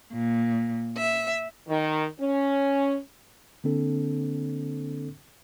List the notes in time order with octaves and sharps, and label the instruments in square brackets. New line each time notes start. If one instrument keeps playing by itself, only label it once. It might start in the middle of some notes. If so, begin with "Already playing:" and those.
[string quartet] A#2
E5
[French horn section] D#3
C#4
[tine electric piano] D3 A#3 C4 D4 A4